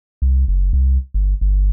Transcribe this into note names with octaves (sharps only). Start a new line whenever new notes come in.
C2
F#1
C2
G1
G1